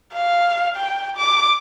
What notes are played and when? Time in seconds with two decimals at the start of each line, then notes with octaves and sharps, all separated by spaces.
0.13 F5
0.76 G5
1.17 D6